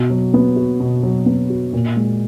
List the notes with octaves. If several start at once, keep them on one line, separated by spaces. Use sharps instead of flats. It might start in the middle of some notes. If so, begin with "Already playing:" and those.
Already playing: B2
F#3
B3
F#4
B2
F#3
B3
F#4
A#2
G#3